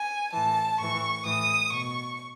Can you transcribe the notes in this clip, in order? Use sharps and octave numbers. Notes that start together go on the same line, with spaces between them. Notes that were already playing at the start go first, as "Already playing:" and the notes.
Already playing: G#5
A2 E3 A5
A2 E3 C#6
A2 E3 D#6
B2 C#6